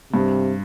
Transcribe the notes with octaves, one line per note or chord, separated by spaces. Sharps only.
G2 C3